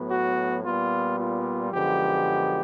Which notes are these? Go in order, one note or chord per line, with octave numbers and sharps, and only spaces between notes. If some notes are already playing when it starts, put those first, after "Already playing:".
Already playing: A2 F#3 B3
F#4
A#2 G3 B3 F4
F4
F#2 D3 F3 G#3 B3 G4